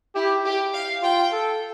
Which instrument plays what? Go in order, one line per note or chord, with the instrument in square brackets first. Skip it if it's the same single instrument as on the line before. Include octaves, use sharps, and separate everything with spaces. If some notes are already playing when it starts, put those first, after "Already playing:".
[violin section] E4 [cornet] G4
[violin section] G4
F5
[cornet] F4 [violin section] G5
[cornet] A4